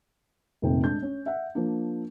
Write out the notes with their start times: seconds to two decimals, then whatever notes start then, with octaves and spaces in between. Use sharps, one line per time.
0.62 F1 A#1 F2 C3 D#3 G5
0.83 G#3 D4 G6
1.02 C#4
1.26 E5 F#5
1.55 F3 A#3 D4